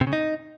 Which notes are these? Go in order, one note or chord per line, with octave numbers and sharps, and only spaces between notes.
C3
C#3
D#4